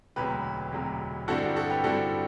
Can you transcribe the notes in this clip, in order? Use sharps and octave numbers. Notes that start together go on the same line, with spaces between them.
E1 D2 C3 F#3 G4 B4
E1 D2 C3 F#3
G2 D3 G3 C4 E4 F#4 A4
G4
F#4 A4
G4 B4
G2 D3 G3 C4 E4 F#4 A4